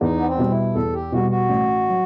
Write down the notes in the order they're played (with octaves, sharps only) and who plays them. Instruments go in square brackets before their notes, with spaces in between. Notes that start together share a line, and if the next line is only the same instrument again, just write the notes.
[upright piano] E2 [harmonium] D#4
[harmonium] B3
C4
[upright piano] B2 G3
[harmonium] E4
[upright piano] E2 [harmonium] A4
[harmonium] G4
[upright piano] B2 G3 [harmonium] F#4
[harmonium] F#4
[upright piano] A1
F#3